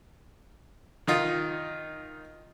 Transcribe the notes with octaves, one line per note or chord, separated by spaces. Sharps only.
D#3 D#4 F4